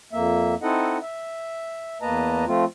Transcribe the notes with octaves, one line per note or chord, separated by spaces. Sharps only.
F2 A#3 E5
C4 D#4 E4 A4 D#5 F#5
E5
E2 A#3 B4 D#5 A5 A#5
F3 A3 C4 F4